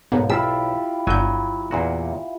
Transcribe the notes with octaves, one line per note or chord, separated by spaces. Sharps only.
B1 G#2 A#3 B3
E4 F4 G4 E6
G1 D3 F#3 G#5 G6
E2 A#2 F#4